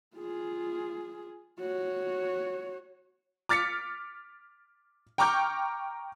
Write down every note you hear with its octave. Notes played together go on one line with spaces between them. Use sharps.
F4 G#4
F#4 C#5
D6 F6 A6 B6 C#7
G5 A#5 C#6 D6 F6 G6